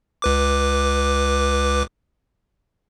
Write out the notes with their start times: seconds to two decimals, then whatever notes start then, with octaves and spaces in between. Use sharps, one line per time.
0.22 C#2 B4 D6